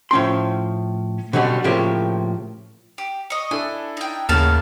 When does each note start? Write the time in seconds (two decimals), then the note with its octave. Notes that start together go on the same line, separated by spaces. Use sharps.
0.11 A2 F3 C#4 G5 C6
1.33 B2 D3 F#3 G3 C#4
1.64 A2 C#3 F3 A#3 G4
2.98 G4
3.30 D#5 C#6
3.51 D4 E4 A4 G#5
3.97 D#4 G5
4.29 D#2 A2 C#3 A#3 F5 F#5 A5